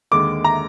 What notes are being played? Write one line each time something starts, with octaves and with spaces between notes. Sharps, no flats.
D#2 D3 G#3 D6
A#5